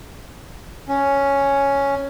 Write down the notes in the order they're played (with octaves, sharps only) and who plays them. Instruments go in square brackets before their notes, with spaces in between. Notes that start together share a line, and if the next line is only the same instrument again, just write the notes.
[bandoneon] C#4